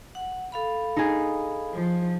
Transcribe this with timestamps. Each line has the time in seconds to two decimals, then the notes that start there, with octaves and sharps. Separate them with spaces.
0.15 F#5
0.52 A4 F5 B5
0.96 D#4 G#4
1.73 F3